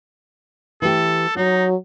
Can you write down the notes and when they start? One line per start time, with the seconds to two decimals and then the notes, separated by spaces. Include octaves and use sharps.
0.82 E3 A3 G4 A4
1.37 F#3 D#4 F#4